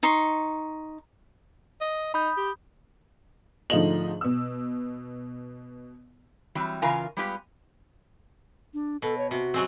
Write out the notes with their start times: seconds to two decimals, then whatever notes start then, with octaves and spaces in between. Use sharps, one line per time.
0.03 D#4 C6 C#6
1.81 D#5
2.14 D#4 B5 D#6 G6
2.37 G4
3.70 G#2 D3 F3 A3 D#5 F#7
4.21 B2 E6
6.55 E3 F#3 G3 C4
6.82 C#3 E3 F4 A#4 F5 G#5
7.17 G3 G#3 B3 F4 G4
8.74 D4
9.02 B2 A4
9.18 C#5
9.31 C3 F#4
9.54 F#3 G#3 C4